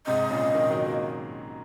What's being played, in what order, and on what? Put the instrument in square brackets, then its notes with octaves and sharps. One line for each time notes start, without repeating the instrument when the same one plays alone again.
[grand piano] G#2 C3 [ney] D#5
[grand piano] A#2 C#3
C3 D#3
D#3 F#3
F#3 A#3